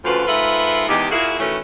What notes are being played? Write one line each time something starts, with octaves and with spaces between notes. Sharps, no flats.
D2 C#3 F3 F4 F#4 B4
G#2 F4 A4 B4 E5 F#5
E2 D#3 G#3 G4
A#2 A#3 E4 F#4 G#4
D#3 E3 A3 C#4 E4 F#4